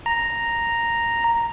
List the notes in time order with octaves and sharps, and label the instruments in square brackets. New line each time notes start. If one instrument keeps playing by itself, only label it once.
[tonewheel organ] A#5